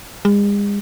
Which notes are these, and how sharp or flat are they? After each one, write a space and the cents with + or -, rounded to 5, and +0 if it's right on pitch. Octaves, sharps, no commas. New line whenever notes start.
G#3 -40